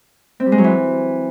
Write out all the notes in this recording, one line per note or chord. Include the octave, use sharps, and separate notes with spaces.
C4
G3
G#3
F#3
E3